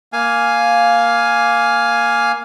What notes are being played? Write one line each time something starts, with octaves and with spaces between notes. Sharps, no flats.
A#3 F5 G#5